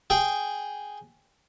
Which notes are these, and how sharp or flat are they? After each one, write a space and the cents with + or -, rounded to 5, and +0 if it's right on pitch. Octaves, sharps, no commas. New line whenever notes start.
G#4 +0 G5 +0